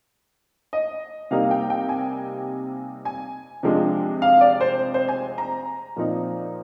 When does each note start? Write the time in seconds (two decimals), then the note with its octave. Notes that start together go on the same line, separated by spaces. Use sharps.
0.73 D#5
1.31 C3 G3 A#3 D#4 F5
1.51 G5
1.70 G5
1.89 G#5
3.05 G#5
3.63 C3 F3 G#3 D4
4.22 F5
4.41 D5
4.61 C5
4.94 C5
5.08 G#5
5.38 A#5
5.96 A#2 F3 C4 D#4